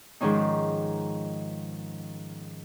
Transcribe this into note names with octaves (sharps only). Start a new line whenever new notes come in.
G#2 D#3 F3 C#4 D#4